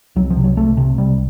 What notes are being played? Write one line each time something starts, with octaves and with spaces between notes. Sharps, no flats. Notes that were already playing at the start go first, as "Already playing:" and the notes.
C2 F#3
F3
C3
F#3
C2 A3
C3
C2 G3